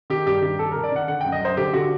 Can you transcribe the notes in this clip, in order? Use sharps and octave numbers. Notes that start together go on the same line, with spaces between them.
D#3 G4
G2 G4
D#3 G4
D#3 A4
A#4
D#3
D5
D#3 F#5
D3 F#5
G5
F#2
D#5
F#2 C5
D3 G4
D3 F#4